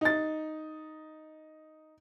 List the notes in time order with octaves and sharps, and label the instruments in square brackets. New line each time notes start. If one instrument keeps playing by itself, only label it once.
[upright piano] D#4 A6